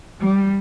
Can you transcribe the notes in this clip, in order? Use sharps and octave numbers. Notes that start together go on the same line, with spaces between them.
G3